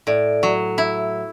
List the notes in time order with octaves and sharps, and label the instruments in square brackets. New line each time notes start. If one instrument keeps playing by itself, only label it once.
[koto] A2 [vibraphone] D5
[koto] F#3
E4